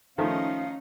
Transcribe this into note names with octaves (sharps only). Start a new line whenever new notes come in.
D#3 F3 A3 C#4 D#4 F5